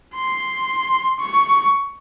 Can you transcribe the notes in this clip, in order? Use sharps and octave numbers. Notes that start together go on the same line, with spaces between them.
C6
C#6